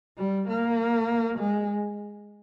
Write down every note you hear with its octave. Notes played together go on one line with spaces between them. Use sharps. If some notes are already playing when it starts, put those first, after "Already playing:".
G3
A#3
G#3